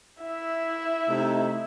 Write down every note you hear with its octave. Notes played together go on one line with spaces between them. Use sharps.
E4 E5
C3 A3 D#4